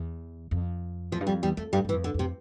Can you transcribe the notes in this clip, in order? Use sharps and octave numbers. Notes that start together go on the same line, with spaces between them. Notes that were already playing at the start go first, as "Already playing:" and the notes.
Already playing: E2
F2
E2 F3
G2
F2 G3
E2 G3
F2 A3
G2 G3
G2
E3
F2
D3
F2 C3